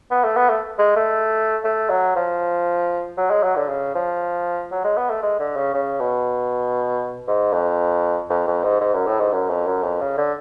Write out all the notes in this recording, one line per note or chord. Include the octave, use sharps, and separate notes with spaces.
B3
A3
B3
A3
G#3
A3
A3
F#3
F3
F#3
G#3
F#3
D3
C#3
F3
F#3
G#3
B3
A3
G#3
D3
C#3
C#3
B2
G#2
F2
F2
F2
G#2
G#2
F#2
A2
G#2
F#2
F2
F#2
F2
C#3
D3